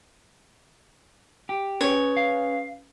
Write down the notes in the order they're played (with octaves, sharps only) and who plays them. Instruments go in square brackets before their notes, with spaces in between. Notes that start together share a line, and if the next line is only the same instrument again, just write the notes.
[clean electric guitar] G4
[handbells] C#4 G#4 B4 [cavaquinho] C#5
[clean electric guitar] F5